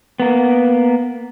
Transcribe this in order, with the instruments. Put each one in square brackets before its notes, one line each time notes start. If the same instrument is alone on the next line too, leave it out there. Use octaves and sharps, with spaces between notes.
[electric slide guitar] A#3 B3